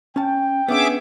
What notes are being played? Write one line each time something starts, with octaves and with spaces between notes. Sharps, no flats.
C#4 G5 A5
B3 C#4 D4 G#4 E5 D6